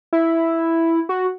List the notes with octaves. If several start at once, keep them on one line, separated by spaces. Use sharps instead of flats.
E4
F#4